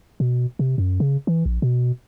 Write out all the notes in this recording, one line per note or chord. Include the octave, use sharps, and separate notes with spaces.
B2
C3
F#2
C#3
E3
A#1
B2